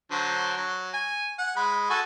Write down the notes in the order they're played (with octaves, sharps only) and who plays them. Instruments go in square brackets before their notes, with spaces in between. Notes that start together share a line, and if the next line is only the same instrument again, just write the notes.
[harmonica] D3 F#3 C5
F#3
G#5
F#5
G#3 B5
F#4 A4 G#5